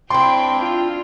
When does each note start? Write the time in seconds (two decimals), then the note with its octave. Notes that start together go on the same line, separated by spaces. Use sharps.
0.10 C4 D4 E4 G5 C6
0.60 F4